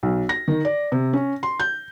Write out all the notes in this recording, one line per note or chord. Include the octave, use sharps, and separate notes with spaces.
B1
A#6
D#3
D5
C3
C#4
C6
G6